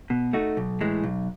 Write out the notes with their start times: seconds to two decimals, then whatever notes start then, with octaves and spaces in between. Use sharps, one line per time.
0.10 B2
0.33 A3 D#4 F#4
0.57 B1
0.81 A2 E3 G#3
1.04 B1